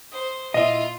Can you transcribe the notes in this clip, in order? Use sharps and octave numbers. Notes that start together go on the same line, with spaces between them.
C5 D#6
A#2 E4 F4 D#5 E5 D#7